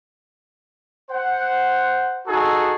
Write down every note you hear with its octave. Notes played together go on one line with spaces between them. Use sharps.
C5 F#5
D#4 F#4 G#4 A4